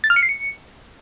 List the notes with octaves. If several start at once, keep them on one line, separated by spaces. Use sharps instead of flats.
A6
F6
C#7
C7
C#7